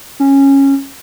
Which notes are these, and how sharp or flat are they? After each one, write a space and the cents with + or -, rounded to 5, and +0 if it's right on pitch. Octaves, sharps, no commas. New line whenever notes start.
C#4 -10